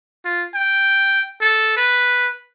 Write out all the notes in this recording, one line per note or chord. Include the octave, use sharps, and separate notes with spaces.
F4
G5
A4
B4